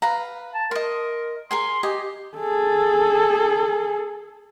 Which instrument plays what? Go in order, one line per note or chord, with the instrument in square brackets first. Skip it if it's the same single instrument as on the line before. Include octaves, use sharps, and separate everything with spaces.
[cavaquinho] B4 F5 A#5
[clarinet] A5
[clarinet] A#4 [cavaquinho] D#5 C6
[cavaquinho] G#4 A#4 G#5 [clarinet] C6
[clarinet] G4 [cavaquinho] D#5 G#5
[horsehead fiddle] G#4 A4